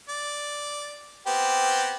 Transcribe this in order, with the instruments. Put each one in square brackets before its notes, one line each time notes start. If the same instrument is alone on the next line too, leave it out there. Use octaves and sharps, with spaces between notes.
[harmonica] D5
B3 C4 G4